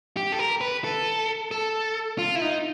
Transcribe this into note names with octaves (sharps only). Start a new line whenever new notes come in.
G4
A4
A#4
B4
A4
A4
F4
E4
D#4